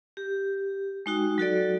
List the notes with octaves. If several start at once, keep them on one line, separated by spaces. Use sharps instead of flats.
G4
G#3 D#4 F#4 G5
F#3 F#4 A4 D5